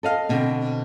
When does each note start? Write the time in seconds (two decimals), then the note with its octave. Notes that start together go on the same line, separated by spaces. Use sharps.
0.03 A4 D#5 F5
0.29 B2 D3 C4